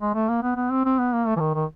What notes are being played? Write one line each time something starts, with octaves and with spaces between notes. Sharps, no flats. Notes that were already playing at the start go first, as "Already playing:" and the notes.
G#3
A3
A#3
B3
B3
C4
C4
B3
A#3
A3
E3
D#3
D#3